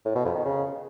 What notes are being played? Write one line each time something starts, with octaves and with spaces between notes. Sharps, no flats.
A2
B2
F2
D#3
C#3